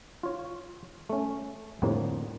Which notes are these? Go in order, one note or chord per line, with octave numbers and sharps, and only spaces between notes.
F4 C#5
A3 C#4
F2 A2 D3 F3 G3 A#3